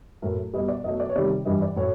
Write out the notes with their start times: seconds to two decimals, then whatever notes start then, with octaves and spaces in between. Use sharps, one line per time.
0.22 A2 F#3 A3 A#4
0.54 B2 G3 D#5
0.68 D5
0.84 B2 F#3 A3 D#5
1.00 D5
1.10 C#5
1.15 C3 D#3 G3 D5
1.45 G2 E3 G3 D#5
1.62 D5
1.76 A2 F#3 A3 C#5